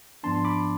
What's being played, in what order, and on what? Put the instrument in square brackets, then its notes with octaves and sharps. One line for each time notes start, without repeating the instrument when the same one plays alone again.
[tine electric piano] G#2 F3 B3 D4 A5 C6
C6
B5 D6